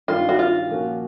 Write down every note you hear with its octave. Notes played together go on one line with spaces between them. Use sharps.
G2 D#3 G3 F4
F#4
F4
A#2 F3 A#3 C#4 F#4